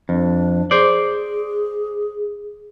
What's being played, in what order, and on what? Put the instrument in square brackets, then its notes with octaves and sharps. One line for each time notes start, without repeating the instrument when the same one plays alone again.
[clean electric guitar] F2 [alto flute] D4
[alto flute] G#4 [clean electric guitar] C5 D5